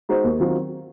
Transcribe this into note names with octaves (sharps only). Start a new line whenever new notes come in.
G#3 D#4 F#4 C5
D#2
D#3 F#3 C4 F4